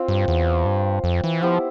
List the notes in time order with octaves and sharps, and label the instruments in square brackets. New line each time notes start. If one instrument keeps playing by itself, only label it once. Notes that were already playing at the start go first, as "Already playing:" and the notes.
Already playing: [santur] C4 F4 C5
[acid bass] G2
E2
G2
F2
E3
[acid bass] F3 [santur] B3 E4 G4 C5